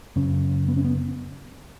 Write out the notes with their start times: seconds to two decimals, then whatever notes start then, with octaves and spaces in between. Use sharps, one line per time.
0.16 F#2 C#3 C#4
0.68 B3
0.77 C#4
0.85 B3